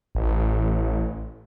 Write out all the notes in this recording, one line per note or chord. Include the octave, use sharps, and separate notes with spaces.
A1